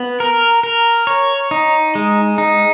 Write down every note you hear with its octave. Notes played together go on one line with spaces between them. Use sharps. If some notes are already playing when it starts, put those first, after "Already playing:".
Already playing: B3
A#4
A#4
C#5
D#4
G#3
D#4